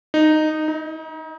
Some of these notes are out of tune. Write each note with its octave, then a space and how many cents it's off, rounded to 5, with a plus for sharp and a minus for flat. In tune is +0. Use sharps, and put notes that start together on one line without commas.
D#4 -10
D#4 +35